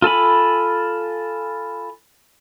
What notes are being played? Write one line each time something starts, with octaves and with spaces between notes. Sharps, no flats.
F4 A4 G#5 B5